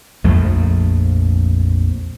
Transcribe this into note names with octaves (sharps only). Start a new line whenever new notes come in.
A#1 F2 F3 A3